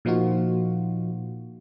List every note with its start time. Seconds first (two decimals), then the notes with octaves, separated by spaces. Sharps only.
0.05 A#2 F3 A#3 D#4 F4 F#4